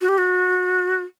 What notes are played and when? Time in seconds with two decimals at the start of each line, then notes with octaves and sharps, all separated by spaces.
0.01 F#4
0.09 G4
0.18 F#4